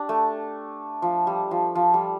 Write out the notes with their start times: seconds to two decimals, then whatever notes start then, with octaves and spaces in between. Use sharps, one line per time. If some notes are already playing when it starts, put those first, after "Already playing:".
Already playing: D4 G4
0.09 A3
1.02 F3
1.27 G3
1.51 F3
1.75 F3
1.94 G3